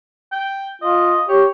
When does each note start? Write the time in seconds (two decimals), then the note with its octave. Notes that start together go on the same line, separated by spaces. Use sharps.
0.32 G5
0.82 F4 D#5
1.29 G4 C#5